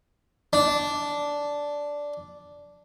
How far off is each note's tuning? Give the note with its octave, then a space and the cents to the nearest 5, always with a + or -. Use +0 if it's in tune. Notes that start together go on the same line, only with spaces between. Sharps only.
D4 -10